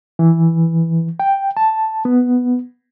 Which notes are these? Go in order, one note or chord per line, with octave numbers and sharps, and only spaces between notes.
E3
G5
A5
B3